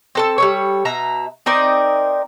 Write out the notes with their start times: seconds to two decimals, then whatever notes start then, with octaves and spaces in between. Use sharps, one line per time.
0.15 C4 A4 A5
0.38 G3 A4 C#5
0.85 B2 E5 A#5
1.46 C4 D#4 A#4 D5